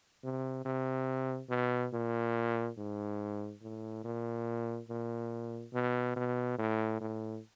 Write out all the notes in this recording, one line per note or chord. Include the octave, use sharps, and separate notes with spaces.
C3
C3
B2
A#2
G#2
A2
A#2
A#2
B2
B2
A2
A2